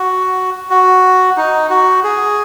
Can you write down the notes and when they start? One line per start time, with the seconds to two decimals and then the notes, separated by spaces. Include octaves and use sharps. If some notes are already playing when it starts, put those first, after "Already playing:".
Already playing: F#4
0.70 F#4
1.37 D#4
1.70 F#4
2.04 G#4